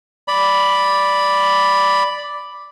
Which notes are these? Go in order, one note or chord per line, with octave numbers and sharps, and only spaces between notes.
D5 B5